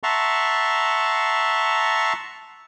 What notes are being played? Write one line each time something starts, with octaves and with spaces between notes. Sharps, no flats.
E5 F#5 A5 A#5 C6 C#6